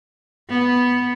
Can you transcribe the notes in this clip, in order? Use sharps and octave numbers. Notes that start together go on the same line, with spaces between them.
B3